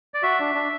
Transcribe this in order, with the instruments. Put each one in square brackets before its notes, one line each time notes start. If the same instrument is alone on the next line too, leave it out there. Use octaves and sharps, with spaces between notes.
[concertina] D5
F#4 E5
D4
D4